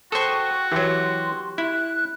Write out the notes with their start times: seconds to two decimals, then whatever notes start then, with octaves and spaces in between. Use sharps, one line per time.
0.12 F#4 A4 C5 G5 C#6 D#6
0.72 E3 F#3 G4 C6
1.58 E4 F#6